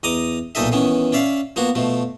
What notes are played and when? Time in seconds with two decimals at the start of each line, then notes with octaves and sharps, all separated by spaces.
0.03 E2 D#5 A#5 D6 D#6
0.55 B1 A#2 D#4 A4 D#5 E5
0.72 D#3 E3 B3 C#4
1.12 C#4 D5 E5 F5
1.56 F3 A#3 B3 F#4
1.75 B2 F3 A3